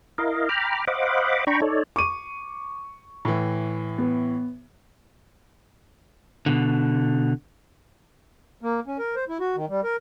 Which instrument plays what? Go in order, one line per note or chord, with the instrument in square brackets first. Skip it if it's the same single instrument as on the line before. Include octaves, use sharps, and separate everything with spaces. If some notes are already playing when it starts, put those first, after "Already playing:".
[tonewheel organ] E4 A#4 D#5 F5
G5 A#5 B5 D6 F6
C5 D#5 F5 F#5 B5 D6
D4 G5 A#5 B5 C#6
D#4 A4 C#5 D5
[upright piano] C#6 D#7 [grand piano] D6
[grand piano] A2 E3
[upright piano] B3
[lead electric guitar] B2 D3
[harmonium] A#3
C#4
A#4
C5
E4
F#4
D#3
G3
A#4